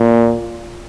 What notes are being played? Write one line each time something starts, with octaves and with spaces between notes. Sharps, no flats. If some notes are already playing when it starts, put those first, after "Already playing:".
Already playing: A#2